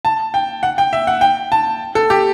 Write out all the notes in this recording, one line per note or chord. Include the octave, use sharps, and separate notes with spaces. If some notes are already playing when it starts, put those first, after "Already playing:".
A5
G5
F#5
G5
E5
F#5
G5
A5
A4
G4